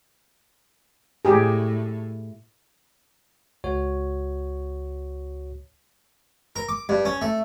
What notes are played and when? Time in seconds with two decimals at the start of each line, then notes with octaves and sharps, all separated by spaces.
1.25 A2 G4 G#4
3.64 C#2 F#4 C#5
6.56 A#4
6.69 D6
6.89 G2
7.05 C#4
7.21 A3